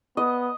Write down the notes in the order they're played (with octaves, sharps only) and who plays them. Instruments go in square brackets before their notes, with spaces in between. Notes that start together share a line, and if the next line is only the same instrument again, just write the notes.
[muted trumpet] B3 [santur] D#5